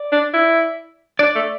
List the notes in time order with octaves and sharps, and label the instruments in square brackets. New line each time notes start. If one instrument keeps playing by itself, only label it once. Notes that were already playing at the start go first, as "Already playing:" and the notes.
Already playing: [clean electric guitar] D5
[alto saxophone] D4
E4
[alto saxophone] D4 [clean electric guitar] D5
[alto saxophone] A3